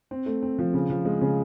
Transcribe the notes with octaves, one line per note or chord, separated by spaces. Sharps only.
C4
A3
C4
F3
C#3
F3
G#3
C#3